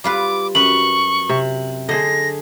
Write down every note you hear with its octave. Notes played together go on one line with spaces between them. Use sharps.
G3 F4 B4 D6
F#2 B4 C#6 F#7
C3
D3 G#4 C5 D#5 A#6